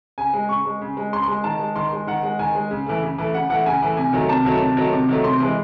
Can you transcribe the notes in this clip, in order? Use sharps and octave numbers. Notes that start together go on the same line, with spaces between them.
C#3 G#5
G#3
C#3 C#6
G#3
C#3
G#3
C#3 C6
C6
G#3
D#3 A5
G#3
D#3 C6
G#3
D#3 F#5
G#3
D#3 G#5
G#3
C#3
E3 A3
C#3
E3 A3
C#3 F#5
E3 A3 F#5
C#3 G#5
E3 A3
C3 G#5
D#3 F#3 A3
C3 A5
D#3 F#3 A3
C3
D#3 F#3 A3
C3
D#3 F#3 A3
C3 C6
E3 G#3